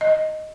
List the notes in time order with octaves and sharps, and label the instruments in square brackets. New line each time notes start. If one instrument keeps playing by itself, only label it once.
[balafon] D#5